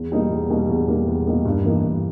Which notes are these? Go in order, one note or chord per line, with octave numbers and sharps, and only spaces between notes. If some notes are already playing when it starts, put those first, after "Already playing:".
Already playing: E2
B2 G3 A#3 D#4
E2
B2 G3 A#3 D#4
E2
B2 G3 A#3 D#4
E2
B2 G3 A#3 D#4
G2
E3 A#3 D#4
G2